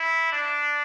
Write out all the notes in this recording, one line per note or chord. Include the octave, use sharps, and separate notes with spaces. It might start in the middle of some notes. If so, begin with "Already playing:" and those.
Already playing: E4
D4